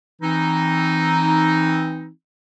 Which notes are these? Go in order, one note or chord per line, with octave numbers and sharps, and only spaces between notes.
E3 C4 D#4